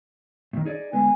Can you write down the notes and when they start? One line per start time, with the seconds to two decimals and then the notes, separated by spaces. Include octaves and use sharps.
0.53 A2 D#3
0.65 D#4 G#4 D5
0.93 D3 G#3 B3 G#5